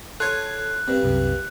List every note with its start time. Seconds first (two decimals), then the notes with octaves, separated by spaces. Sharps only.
0.20 F4 A4 C#5 F#6 G#6
0.88 G2 C4
1.03 C2 F#2 C3